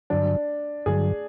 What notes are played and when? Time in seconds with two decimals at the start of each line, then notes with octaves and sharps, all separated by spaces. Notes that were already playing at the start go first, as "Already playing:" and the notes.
0.10 G2 D3 F#3 D4
0.86 G2 D3 F#3 G#4